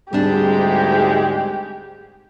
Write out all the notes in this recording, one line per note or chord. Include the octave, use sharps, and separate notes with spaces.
D2 G#2 G3 G#3 C4 D4 G4